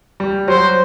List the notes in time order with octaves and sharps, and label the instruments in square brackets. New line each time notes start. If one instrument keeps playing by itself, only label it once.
[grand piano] G3
[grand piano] F#3 [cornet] C5